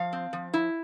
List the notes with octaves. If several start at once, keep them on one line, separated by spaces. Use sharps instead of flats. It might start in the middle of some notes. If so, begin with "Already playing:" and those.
Already playing: F3 F5
C4
F3
E4